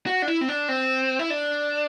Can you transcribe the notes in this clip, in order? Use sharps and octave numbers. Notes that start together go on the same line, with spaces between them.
F#4
D4
E4
C4
D4
C4
E4
D4